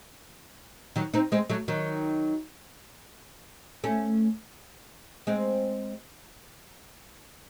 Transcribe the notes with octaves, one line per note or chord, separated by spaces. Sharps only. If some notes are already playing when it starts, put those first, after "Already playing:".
D#3 F#3
C4 D#4
G#3 C4
F#3 A3
D#3 F#3
A3 C#4
G#3 C4